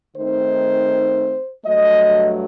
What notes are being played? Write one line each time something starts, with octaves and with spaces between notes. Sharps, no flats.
D#3 A3 C4 D#4 C5
G2 F#3 A3 D#5